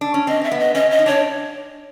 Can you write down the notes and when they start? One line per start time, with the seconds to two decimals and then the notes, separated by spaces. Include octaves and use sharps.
0.01 D4
0.14 C#4
0.27 C4 D#5
0.41 C4 E5
0.51 B3
0.59 D#5
0.75 C#4 D#5
0.91 D#5
0.99 D#4
1.06 D4 C#5